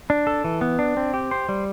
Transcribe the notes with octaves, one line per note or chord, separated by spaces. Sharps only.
D4
A4
E3
B3
D4
C4
G4
C5
G3